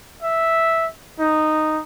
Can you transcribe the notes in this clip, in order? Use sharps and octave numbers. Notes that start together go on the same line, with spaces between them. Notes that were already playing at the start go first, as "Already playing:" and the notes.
E5
D#4